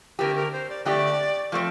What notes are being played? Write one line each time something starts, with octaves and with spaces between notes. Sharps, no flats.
D3 A3 C4 G4 A#4
A#4
C5
D5
D3 A3 C4 G4 D5 D#5
F3 A3 C4 D5